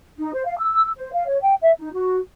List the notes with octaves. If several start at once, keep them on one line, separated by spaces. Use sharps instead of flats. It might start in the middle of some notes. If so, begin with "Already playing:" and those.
D#4
C5
F5
E6
C5
F5
C#5
G5
E5
D#4
F#4